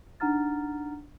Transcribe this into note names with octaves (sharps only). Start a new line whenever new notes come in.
D4 D#4 F#5 A#5 F6 A6